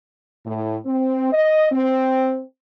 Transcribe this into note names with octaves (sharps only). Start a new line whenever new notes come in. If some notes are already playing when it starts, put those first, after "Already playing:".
A2
C4
D#5
C4